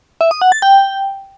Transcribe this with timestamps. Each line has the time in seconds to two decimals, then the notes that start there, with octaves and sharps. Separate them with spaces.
0.21 E5
0.31 D#6
0.42 F#5
0.52 A6
0.62 G5